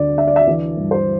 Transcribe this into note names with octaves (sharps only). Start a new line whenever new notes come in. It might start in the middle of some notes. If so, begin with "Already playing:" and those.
Already playing: D2 D4 D5
D4 E5
D5
E5
E3 D5
G2
C5